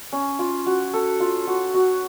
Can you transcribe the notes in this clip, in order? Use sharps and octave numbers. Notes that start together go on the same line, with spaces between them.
C#4
F4
F#4
A4
F4
F#4
F#4